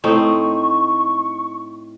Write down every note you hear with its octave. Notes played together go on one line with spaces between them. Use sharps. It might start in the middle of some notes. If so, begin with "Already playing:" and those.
A2 C4 D#4 C#6